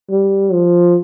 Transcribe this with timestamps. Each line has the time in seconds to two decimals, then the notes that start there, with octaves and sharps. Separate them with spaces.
0.11 G3
0.53 F3